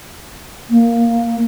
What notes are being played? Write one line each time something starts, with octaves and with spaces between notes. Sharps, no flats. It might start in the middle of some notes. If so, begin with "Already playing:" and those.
A#3